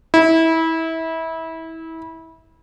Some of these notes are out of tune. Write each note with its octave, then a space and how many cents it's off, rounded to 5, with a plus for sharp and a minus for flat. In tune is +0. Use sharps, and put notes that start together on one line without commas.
E4 -25